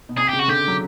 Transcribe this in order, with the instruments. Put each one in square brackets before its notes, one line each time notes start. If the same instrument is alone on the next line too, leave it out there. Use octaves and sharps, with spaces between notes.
[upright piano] B2
[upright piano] C3 [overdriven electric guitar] G#4
[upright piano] C#3 [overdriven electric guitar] G4
[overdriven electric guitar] F#4
[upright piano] D3 [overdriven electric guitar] G4
[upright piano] F#3